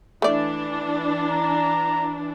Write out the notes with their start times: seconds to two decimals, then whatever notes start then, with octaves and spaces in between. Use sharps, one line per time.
0.22 E3 A3 D4 D5
1.31 A#5